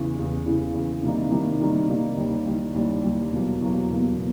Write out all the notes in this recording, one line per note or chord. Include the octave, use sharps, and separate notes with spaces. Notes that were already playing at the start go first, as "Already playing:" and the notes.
Already playing: E2 C#3 E3
E2 C#3 E3
E2 C#3 E3
E2 C#3 E3
C3 D#3 G3 A#3 D#4
C3 D#3 G3 A#3 D#4
C3 D#3 G3 A#3 D#4
C3 D#3 G3 A#3 D#4
D#2 D#3 G3
D#2 D#3 G3
D#2 D#3 G3
D#2 D#3 G3
E2 B2 F#3 A#3
E2 B2 F#3 A#3
E2 B2 F#3 A#3
B2